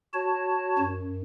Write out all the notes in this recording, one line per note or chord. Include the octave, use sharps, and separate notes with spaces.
F#4 C#5 A5
F#2